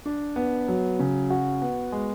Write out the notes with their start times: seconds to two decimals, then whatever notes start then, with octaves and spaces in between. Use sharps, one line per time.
0.06 D4
0.36 B3
0.68 F#3
1.00 C#3
1.30 F#4
1.62 B3
1.92 G#3